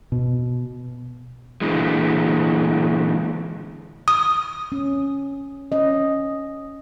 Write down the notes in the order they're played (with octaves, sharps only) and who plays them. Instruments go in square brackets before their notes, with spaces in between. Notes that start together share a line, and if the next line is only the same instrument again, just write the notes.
[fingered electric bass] B2
[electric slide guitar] A#2 D3 E3 G#3
[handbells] D#6
[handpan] C#4
C#4 D#5